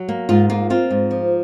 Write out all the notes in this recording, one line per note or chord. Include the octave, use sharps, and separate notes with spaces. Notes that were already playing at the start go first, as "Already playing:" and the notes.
Already playing: F#3
A#3
G#2 F4
A#3 F4
C4 F4
G#2
F3